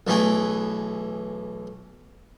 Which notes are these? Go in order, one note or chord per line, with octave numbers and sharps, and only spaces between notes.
B1 E3 A3 B3 G#4 G5